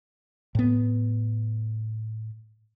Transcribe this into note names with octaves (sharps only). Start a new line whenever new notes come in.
A2 B3